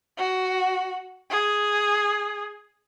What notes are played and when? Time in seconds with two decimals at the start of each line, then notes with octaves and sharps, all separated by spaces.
0.18 F#4
1.30 G#4